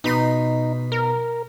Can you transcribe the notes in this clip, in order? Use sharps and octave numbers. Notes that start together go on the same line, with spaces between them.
B2 D#4 B5 C6
A#4